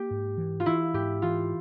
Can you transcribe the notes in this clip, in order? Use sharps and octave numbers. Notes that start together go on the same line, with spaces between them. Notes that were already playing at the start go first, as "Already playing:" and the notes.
Already playing: A#3 G4
G#2
E3
F4
E3 E4
G#2 G4
E3 F4